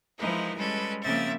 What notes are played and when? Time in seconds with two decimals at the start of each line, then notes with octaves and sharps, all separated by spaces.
0.18 E3 F3 G#3 D#4 E4 A#4
0.58 G3 G#3 C#4 A4 B4
1.03 C#3 F3 A#3 C4 E5 A6